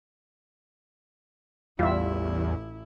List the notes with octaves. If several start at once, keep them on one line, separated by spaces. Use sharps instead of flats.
A1 E2 G3 E4 F4 E5